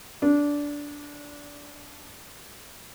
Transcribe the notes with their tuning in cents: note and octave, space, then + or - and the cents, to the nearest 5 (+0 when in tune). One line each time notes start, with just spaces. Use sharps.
D4 -15